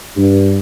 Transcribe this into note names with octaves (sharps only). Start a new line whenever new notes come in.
G2